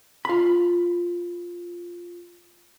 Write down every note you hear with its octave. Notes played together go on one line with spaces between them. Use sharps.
F4 B5